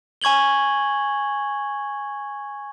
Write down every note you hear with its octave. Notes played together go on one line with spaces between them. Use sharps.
G#5 C#6 G#6 F#7 G7